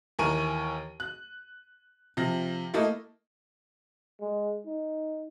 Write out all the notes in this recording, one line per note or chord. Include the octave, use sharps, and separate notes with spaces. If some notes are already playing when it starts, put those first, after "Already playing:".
D#2 E3 A#4 G#5 C#6 D#7
F#6
C3 F3 A#6
A3 A#3 E4 A4 D#5
G#3
D#4